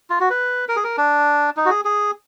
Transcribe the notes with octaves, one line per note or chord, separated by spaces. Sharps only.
F4
F#4
B4
A#4
G#4
A#4
D4
D#4
F#4
G#4
G#4